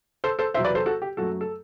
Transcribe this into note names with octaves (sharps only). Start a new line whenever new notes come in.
A4 C5
A4 C5
E2 C3 F#3 C5 E5
B4 D5
A4 C5
F#4 A4
G4
F#2 F#3 A3 F#4 A4
A4